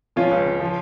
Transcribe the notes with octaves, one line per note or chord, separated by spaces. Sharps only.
F3 C#4 F4
C#2
C#3
F3